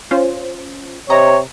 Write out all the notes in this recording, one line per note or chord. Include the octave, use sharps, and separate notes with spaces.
C#4 F4 C5
C3 C#5 D#5 A#5